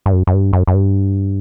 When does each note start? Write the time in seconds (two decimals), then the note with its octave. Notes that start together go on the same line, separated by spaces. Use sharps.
0.06 G2
0.13 F#2
0.27 F#2
0.34 G2
0.53 F#2
0.67 F#2
0.74 G2